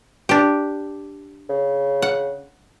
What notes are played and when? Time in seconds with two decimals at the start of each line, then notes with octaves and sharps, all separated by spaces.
0.29 D4 G4
1.50 C#3
2.02 F#5